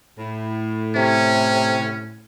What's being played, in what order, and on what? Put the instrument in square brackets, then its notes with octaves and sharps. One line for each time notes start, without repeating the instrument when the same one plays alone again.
[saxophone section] A2
[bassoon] C3 [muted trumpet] C#4